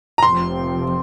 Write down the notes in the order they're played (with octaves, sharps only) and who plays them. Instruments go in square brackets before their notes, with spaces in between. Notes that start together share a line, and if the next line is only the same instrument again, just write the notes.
[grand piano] A#5
[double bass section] F1 F2 C3 F3 C4 [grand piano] C6